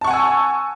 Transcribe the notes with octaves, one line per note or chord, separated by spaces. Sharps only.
F#5 G#5 A5 C#6 E6